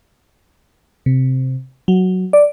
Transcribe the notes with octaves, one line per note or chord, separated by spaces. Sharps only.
C3
F#3
D5